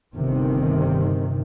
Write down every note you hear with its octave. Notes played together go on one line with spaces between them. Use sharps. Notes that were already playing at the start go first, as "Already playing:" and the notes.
G1 C3 D#3